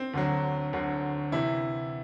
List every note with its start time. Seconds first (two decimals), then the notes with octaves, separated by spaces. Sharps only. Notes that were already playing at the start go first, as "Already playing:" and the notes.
Already playing: C4
0.14 D2 D3 F#3
0.73 D2 D3 F#3
1.32 C3 E3 E4